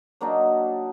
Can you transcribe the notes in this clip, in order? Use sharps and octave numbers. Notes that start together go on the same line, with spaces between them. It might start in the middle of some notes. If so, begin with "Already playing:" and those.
F#3 A#3 D4 D#4